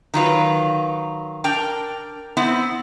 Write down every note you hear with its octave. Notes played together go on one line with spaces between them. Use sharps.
D#3 F#3 F4 B4
D4 A#4 G5
B3 C4 E4